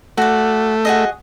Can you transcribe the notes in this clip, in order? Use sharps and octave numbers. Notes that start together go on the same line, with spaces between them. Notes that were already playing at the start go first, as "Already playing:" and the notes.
A3 F#4 D5
F#4 G#4 D#5